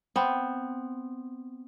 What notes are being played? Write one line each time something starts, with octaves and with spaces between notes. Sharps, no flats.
B3 C4